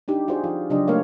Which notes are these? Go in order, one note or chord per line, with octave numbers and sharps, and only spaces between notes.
D4 D#4 G4
F4 F#4 G#4 C5 D5
F3 F4
C#3 F#3 D4 G4 D#5
A3 A#3 A#4 C#5 F5